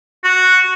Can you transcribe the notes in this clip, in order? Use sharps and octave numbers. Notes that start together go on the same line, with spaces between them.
F#4